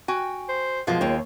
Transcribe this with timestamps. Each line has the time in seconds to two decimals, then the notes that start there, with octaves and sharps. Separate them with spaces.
0.08 F#4 G5 G#5
0.49 C5
0.87 B2 F3 G#3 A#3 F4
1.01 D#2 C#5 G5